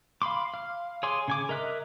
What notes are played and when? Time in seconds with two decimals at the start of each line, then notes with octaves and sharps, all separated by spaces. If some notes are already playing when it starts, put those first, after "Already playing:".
0.22 F5 B5 C6 D6
0.54 F5
1.03 G#4 C#5 G#5 C6 D6
1.28 C#3 G#5 D6
1.49 A#4 D#5 E5 F#6